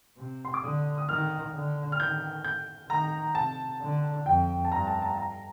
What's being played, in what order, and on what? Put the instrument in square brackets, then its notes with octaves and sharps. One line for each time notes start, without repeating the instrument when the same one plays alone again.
[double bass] C3
[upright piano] C6
D6
[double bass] D3 [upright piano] D#6
[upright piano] D#6
[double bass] D#3 [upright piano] F6
[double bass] D3
[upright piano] F6
[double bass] D#3 [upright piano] G6
[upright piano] G6
[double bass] D#3 [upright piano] A#5
[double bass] C3 [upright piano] A5
[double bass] D3
[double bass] F2 [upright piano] G5
[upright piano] A5
[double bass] G2 [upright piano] A#5
[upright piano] A5
A5
A#5